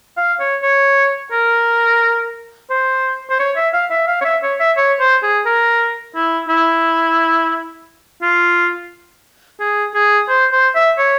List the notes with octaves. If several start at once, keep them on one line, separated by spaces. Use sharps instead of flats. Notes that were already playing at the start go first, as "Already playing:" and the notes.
F5
C#5
C#5
A#4
C5
C5
C#5
E5
F5
E5
F5
C#5
E5
C#5
E5
C#5
C5
G#4
A#4
E4
E4
F4
G#4
G#4
C5
C5
E5
C#5